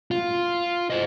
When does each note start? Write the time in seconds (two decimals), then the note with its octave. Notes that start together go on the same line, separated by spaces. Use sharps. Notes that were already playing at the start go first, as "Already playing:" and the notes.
0.11 F4
0.90 C5 D#5